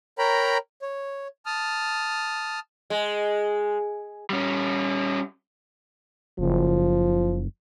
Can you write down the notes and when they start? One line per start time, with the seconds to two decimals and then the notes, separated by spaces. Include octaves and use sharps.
0.19 A#4 C#5 G5 A#5 B5
0.82 C#5
1.46 A5 D#6 F6
2.90 G#3
4.30 G3 C#4
6.39 F#1 F3